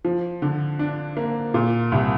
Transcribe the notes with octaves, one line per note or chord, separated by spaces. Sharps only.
F3
D3
D4
A#3
A#2
C2